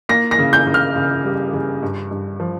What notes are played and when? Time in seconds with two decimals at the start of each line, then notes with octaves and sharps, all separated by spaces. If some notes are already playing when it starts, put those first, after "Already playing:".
0.09 A#3 A#6
0.31 A#6
0.39 C#3
0.53 G6
0.67 C#3
0.74 F6
0.96 C#3
1.24 G3
1.53 C#3
1.83 G2
2.11 G2
2.40 F3